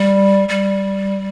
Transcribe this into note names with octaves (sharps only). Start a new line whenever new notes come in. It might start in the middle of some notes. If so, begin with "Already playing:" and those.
Already playing: G3
G3